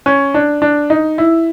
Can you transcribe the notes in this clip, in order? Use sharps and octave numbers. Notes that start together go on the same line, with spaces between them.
C#4
D4
D4
D#4
E4